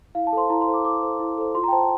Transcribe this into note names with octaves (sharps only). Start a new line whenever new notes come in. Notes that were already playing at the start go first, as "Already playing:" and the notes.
E4 F5
A5
A4 C5 C6
E4 A#5
C6
A4 C5
D6
E4 D6
A4 C5
E4
A4 C5
F4 C6
A#5
G5
C5 A5